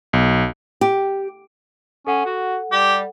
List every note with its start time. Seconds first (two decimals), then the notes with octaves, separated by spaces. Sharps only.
0.13 B1
0.81 G4
2.07 C#4 A4 F#5
2.26 F#4
2.72 G3 G4